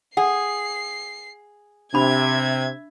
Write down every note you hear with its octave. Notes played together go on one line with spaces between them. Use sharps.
G#4 F#5 C7
C3 D4 E5 B5 G#6